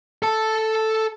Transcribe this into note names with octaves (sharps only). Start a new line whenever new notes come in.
A4 A5